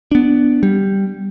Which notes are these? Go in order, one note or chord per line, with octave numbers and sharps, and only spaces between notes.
B3 D4
G3